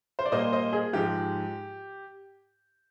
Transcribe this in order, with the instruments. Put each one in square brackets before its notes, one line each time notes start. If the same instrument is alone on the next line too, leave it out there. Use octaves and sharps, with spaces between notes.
[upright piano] C5
D5
A#2 G3 A#3 C5 D#5
C5 D#5
G#4
G#2 F3 G#3 G4